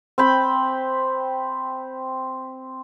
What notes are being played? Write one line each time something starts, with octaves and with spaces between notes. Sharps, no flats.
C4 G5 B5